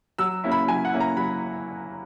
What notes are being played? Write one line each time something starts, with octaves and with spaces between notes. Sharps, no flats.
F#3 E6
A#3 C#4 E4
B5
F#3 G#5
F#5
A#3 C#4 E4
A#5
F#3 B5